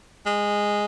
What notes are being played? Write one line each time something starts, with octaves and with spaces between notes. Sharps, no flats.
G#3